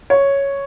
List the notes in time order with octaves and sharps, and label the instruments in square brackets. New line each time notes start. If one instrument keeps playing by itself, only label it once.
[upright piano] C#5